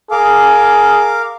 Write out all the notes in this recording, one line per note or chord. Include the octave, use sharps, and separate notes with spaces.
G#4 A#4 F5 D6